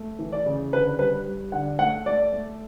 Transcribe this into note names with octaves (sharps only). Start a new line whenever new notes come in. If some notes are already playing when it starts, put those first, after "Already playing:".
Already playing: A3
E3
D5
C#3
D3 B4
G3 B4
G3
D3 F#5
A3 F#5
A3 D5
A3